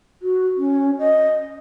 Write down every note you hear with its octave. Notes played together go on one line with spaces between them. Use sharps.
F#4
C#4
D#5